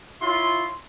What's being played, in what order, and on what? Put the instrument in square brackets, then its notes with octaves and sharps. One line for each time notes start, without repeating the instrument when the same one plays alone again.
[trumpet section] E4 F4 C#5 C6